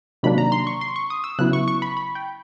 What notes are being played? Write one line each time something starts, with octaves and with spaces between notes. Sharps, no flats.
C3 D#3 F#3 A#3 D4 B5
A#5
C6
C#6
C6
C#6
D#6
E6
C#3 F#3 B3 E4 F#6
C#6
C#6
B5
B5
G5